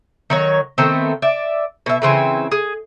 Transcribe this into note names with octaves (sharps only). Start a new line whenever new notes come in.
D#3 F#3 C#5
D#3 A3 B3 C4
D5 E5
B2 E5
C#3 E3 C4 G#5
G#4